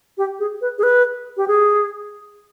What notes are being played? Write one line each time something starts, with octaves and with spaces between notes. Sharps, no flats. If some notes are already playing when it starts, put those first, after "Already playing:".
G4
G#4
B4
G#4
B4
G4
G#4